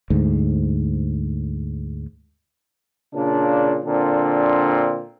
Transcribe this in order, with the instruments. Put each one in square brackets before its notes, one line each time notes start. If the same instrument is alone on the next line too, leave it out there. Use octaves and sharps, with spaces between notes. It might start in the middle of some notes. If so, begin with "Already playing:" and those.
[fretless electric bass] D2 G#2
[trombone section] A#2 C#3 D4
A#2 D3 C4 D4